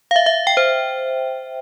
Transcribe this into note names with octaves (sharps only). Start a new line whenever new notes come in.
F5
E5
E5
G5
C5